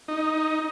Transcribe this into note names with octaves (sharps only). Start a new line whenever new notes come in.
D#4